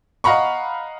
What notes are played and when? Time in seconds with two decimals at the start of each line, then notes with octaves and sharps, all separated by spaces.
0.24 D#5 F5 F#5 A#5 B5 C#6